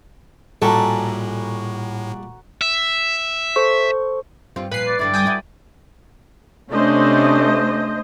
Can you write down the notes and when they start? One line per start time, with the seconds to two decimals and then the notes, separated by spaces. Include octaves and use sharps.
0.62 A#1 A2 G3 F#4 A4 G#5 A#5
2.61 E5
3.56 A4 C5 C#6
4.56 G2 C4 F4
4.71 A#2 F3 B4 C7
4.87 D5
4.99 G2 D3 E4 D5
5.14 G5 G#5 D#6
5.26 E4 F#4
6.70 C3 A3 C#4 D4 C5 D#5